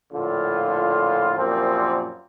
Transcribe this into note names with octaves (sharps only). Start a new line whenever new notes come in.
A#1 A2 D3 F4
F#2 A#2 F3 G3 A#3 C4